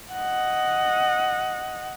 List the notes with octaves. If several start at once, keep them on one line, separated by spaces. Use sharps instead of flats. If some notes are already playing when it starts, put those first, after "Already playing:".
D#5 F#5